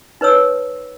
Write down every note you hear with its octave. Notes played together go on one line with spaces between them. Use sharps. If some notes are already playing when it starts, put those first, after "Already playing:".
D#4 B4 C#5 E6